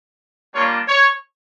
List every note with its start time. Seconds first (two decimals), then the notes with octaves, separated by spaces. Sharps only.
0.54 G3 A#3 D4 F4 C#5
0.87 C#5